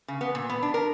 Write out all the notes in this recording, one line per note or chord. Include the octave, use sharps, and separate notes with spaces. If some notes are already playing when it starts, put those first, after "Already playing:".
C#3
B3
A#2
B3
D4
A#4